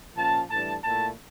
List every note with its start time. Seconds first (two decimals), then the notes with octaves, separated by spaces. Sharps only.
0.16 A#2 F3 C#4 A5
0.50 A2 E3 G3 D4 A5
0.84 A#2 A3 E4 A5